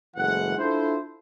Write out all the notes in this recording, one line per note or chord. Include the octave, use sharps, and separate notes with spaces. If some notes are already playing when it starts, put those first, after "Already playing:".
F#1 E3 G#3 A3 F#5
D4 E4 F4 A4 C5